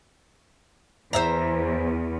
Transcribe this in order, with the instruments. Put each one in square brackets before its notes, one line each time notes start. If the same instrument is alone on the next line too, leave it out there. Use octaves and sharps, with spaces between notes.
[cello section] E2 [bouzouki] C5 E5 A#5